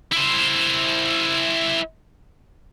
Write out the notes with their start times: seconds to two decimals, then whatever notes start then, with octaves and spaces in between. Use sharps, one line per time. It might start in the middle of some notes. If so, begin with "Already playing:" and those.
0.12 E4 C5